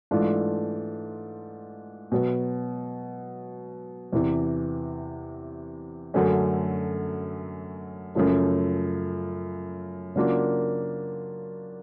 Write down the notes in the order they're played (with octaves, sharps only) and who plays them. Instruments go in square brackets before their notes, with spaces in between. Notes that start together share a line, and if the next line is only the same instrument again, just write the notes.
[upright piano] G#2 E3 A3 D4 F4
B2 F#3 B3
E2 C3 E3
F#2 D3 F#3 A3 C#4
F#2 C#3 F3 A3
C#3 F#3 A#3 D4 F4